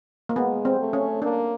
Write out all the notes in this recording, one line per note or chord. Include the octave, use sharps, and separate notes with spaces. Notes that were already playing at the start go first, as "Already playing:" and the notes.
A#3
G#3 B3
C4
A3
C#4
A#3 D4